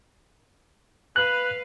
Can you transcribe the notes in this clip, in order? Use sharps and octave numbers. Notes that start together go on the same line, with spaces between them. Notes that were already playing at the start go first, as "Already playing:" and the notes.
B4 F5 F#6